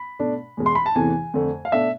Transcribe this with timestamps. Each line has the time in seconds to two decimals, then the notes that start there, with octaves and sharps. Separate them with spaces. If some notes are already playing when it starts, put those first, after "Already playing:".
Already playing: B5
0.19 B2 A3 D4
0.57 E2 B2 G#3
0.66 C6
0.75 B5
0.86 A5
0.95 E2 C3 E3 A3 G#5
1.34 F2 D3 A3
1.65 F5
1.72 B2 A3 D4 E5